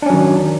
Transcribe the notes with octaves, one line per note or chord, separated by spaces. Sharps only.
D#3 F#3 C#4 D4